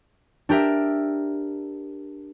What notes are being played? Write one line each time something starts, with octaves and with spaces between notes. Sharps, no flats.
D4 G4 A#4 E5